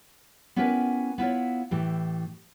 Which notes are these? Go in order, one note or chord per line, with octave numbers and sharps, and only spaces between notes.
B3 C#4 E4 G4 A#4 B4
B3 E4 F4 C#5
A2 E3 G4